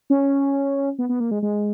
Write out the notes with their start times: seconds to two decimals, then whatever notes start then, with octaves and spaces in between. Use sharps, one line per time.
0.10 C#4
0.99 B3
1.09 B3
1.20 A#3
1.31 G#3
1.43 G#3